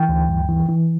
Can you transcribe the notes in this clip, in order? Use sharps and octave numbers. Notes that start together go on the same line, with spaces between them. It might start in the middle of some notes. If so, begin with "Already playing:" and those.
Already playing: E3 G5
D2
G2
E3
E3